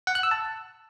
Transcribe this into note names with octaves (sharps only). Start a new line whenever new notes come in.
F#5
F#6
E6
A5